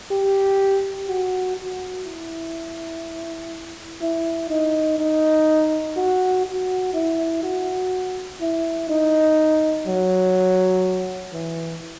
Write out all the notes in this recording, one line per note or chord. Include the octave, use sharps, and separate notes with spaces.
G4
F#4
F#4
E4
E4
D#4
D#4
F#4
F#4
E4
F#4
E4
D#4
F#3
E3